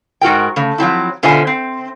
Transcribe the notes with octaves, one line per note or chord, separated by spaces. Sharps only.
G#2 F#4 A#4 G5
C#3 A3
F3 F#3 C4 E4
B2 D3 F4 C5 E5 G#5
C4